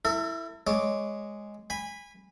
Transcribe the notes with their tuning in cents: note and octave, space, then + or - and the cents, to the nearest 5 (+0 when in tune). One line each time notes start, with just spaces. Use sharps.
E4 +0 A4 +45
G#3 +0 C#5 +0 D6 +0
G#5 -20 B5 +0